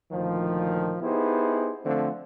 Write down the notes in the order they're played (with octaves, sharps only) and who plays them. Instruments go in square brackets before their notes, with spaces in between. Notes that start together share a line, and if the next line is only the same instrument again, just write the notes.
[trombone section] D2 A#2 D#3 F3
B3 D#4 E4 G4 G#4 C5
D3 F3 A3 C4